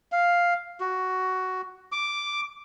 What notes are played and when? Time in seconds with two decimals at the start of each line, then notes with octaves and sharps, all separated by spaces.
0.12 F5
0.80 F#4
1.92 D6